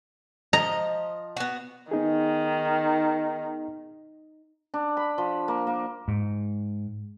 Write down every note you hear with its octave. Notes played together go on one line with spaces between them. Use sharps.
F3 D#5 A#5
B3 F#4
D#3 B3 D#4 G#4
D4
B5
F3
A#3
A#3
G#2